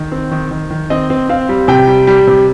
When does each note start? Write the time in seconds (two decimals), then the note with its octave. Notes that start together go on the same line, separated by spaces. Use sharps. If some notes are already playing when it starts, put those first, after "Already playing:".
Already playing: D#3
0.12 C4
0.31 D#3
0.51 D#3
0.71 D#3
0.90 C4 D#5
1.10 C4
1.29 C4 F5
1.49 G3
1.68 C3 G5
1.87 G3
2.07 G3
2.27 C3